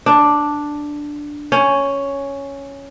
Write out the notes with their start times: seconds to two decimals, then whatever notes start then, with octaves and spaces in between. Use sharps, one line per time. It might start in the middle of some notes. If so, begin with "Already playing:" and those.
0.06 D4
1.52 C#4